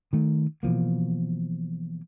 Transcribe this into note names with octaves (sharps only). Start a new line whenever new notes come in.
D#3 A3
B2 E3 F3 A#3